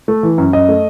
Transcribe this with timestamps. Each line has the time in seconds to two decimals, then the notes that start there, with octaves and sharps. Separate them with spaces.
0.08 A3
0.23 E3
0.38 F#2
0.53 F#2 D#5
0.69 A3